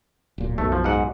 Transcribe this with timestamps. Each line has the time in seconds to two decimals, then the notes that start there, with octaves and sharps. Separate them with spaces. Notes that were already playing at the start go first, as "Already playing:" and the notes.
0.38 D1 A#2
0.58 B1 F#2 B2 A3
0.72 F3
0.84 G#2 F#5